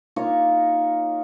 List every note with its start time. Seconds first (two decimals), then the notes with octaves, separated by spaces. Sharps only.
0.16 A#3 D#4 F4 C#5